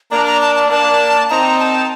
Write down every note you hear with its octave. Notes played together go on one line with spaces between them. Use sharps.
A#3 D4 A#5
A#5
A5
A5
A#3 D4 A5
C4 D#4 A#5
A5